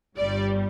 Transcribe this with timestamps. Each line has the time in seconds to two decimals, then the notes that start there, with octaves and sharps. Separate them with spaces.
0.17 G1 G2 G3 D5